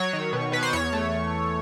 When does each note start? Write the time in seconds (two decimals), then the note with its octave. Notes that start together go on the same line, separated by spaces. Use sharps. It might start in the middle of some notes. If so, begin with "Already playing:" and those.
Already playing: F#3 C#5
0.13 D#3
0.33 B2
0.52 B2 B4
0.63 C5
0.73 E2 C#5
0.93 A3